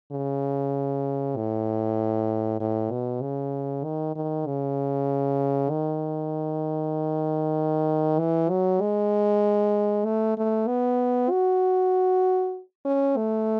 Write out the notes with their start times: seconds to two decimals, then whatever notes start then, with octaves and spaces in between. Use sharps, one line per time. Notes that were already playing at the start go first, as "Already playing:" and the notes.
0.12 C#3
1.36 A2
2.60 A2
2.91 B2
3.22 C#3
3.84 D#3
4.16 D#3
4.46 C#3
5.70 D#3
8.19 E3
8.50 F#3
8.81 G#3
10.05 A3
10.37 A3
10.67 B3
11.30 F#4
12.85 C#4
13.17 A3